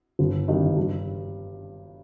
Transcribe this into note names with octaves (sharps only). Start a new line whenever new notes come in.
G1
G2 D#3
G2